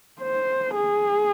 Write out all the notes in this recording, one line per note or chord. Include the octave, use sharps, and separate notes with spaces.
C5
G#4